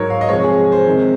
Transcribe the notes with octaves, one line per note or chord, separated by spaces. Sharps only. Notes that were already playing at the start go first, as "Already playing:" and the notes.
Already playing: G#2 F#3 A#4 C#5
F5
D#5
C3 F3 G#3 C#5
G#4
C5
C3 D#3 G#3